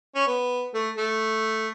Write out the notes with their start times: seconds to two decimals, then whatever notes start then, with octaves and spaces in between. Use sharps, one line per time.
0.15 C#4
0.27 B3
0.74 A3
0.98 A3